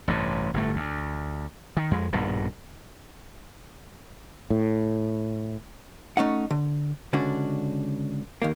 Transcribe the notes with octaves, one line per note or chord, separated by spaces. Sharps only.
A1 G2 C3
G1 A2 A3
D2
D#3
F2 G#3
A#1 G2 B2 D#3
A2
A3 C#4 D#4 F#5
D3
C#2 D3 C#4 D4 F#4
D#2 D#3 A#3